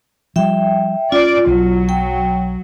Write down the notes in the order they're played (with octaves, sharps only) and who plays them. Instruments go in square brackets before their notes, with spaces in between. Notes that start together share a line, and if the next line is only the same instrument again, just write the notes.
[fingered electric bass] F3 G3 [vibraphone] E5 G5
[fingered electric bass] C#4 [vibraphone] F4 [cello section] D5
[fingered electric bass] B1 [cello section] F#3
[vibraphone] G5